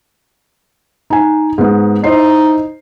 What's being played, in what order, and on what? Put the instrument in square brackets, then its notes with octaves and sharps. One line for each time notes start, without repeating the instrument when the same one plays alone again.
[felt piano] D#4 G#5
G#2 B3
[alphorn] D#4 [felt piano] E4 C5 C7